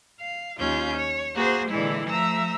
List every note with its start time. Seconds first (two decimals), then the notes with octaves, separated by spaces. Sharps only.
0.20 F5
0.58 D#2 C#4 F4 G6
0.96 C#5
1.34 A#3 F#4 G#4 C5
1.69 A#2 D3 E3 G#3 E4
2.08 F3 A3 E5 A#5 E6